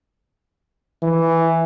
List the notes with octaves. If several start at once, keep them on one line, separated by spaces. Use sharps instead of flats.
E3